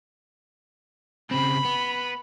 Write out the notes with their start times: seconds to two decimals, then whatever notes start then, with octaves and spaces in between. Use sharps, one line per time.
1.31 C#3 C4 B5
1.65 B3